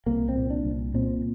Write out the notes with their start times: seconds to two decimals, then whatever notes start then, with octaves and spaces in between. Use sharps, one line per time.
0.06 C2 A#3
0.29 C4
0.36 A#2
0.50 D4
0.65 C2
0.94 A#2 C4